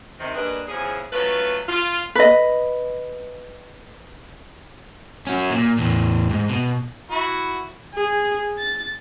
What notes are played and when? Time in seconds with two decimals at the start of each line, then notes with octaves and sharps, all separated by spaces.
0.19 C3 D#3
0.35 G2 A#3 D4 G#4 B4 D#5
0.68 E2 C#3 F3 G#4
1.13 F#3 A3 C#4 F4 B4
1.68 F4
2.15 B4 D#5
5.27 C#4 F#4
5.51 A#2
5.78 E2 A2
6.31 G#2
6.49 B2
7.10 E4 F#4
7.95 G#4
8.59 A6